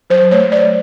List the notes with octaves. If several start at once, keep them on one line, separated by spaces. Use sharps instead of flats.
F#3 C5
A3 C#5
F#3 D5